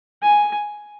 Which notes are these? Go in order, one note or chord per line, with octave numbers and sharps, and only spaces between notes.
G#5